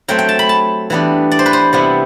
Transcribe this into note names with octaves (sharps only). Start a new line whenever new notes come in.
F#3 A3 C4 G5
G5
A5
B5
A5
E3 G3 B3 D4
D5
C5
B4
C5
C3 G3 B3 E4